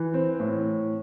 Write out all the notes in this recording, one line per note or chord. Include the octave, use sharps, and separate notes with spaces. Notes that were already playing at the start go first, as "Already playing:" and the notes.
Already playing: E3
C4
A2